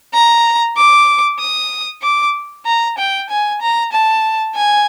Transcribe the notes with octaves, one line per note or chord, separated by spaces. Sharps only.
A#5
D6
D#6
D6
A#5
G5
G#5
A#5
A5
G#5